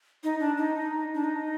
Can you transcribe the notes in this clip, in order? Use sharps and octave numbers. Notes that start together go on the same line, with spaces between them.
D#4
D4
D#4
D4
D#4